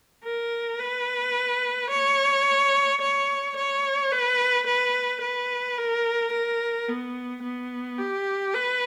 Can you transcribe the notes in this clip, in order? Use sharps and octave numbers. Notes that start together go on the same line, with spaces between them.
A#4
B4
C#5
C#5
C#5
B4
B4
B4
A#4
A#4
B3
B3
G4
B4